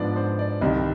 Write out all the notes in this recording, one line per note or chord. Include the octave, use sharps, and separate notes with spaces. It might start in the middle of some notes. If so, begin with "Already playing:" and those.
Already playing: G#2 F3 B3 D4 D5
C5
D5
C2 C3 D#3 D#5